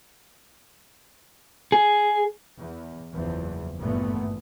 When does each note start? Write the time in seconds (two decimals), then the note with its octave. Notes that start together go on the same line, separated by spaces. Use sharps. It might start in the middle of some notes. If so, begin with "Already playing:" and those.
1.72 G#4
2.59 E2
3.12 F#1 E2 F3
3.80 G#1 G2 A#2 E3 A3 B3